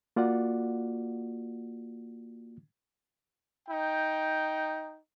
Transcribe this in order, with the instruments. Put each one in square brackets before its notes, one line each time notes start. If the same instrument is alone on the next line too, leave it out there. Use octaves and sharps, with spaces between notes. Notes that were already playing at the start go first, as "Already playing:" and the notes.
[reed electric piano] A#3 F4 F#4 D5 F#5
[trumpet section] D#4 G5